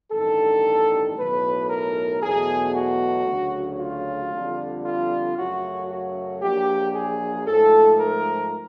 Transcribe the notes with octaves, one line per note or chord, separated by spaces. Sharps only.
A1 G2 D#3 A4
B1 A2 F#3 B4
A#4
E2 B2 F#3 A3 G#4
F#4
D2 C#3 F#3
F4
F2 D3 G3
F4
F#2 C#3 F#3 A3 F#4
F#4
A#1 A#2 F#3 G4
G#4
G#2 F3 A3 A4
A#4